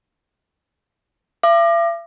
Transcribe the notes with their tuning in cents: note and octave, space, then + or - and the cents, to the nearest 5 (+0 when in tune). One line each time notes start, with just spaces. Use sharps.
E5 +45 D6 +30